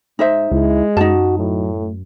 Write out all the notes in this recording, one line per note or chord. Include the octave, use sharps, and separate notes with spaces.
G#2 D#4 C5 E5
C#2 G#3 E4
F#2 D#4 F#4 A5
A2 F#3
A3